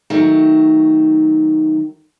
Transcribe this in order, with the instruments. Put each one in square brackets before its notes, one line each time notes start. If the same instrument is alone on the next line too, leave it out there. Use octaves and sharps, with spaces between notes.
[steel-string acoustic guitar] D#3 F#3 A3